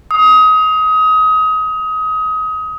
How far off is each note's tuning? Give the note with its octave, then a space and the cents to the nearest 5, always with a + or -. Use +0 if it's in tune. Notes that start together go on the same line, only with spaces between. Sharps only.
D#6 +25